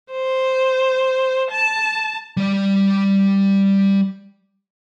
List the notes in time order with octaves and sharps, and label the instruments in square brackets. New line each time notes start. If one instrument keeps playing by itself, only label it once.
[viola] C5
A5
[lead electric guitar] G3 D5